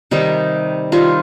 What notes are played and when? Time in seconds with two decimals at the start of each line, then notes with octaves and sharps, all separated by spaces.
0.11 C3 D#3 G3 D#4
0.92 C3 D#3 G3 F4